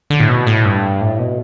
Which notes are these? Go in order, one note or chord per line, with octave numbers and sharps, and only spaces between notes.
D3
A2
B2
A2
G2
A2
B2